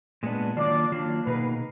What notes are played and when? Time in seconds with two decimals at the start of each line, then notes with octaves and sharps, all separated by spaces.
0.23 A#2 G#3 B3 D4
0.57 D#3 F#3 A#3 D4 F4 D5
0.92 D#3 F#3 A#3 D4 F4
1.26 B2 A#3 D#4 G#4 B4